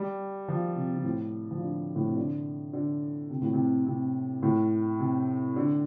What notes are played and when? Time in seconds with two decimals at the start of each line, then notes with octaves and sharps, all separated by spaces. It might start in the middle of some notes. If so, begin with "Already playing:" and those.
Already playing: G3
0.48 F3
0.76 C3
0.96 C3
1.04 A2
1.51 F3
1.60 D3
1.96 A2
2.07 C3
2.17 D3
2.73 D3
3.30 C3
3.42 A2
3.53 C3
3.86 C3
4.43 A2
4.99 C3
5.56 D3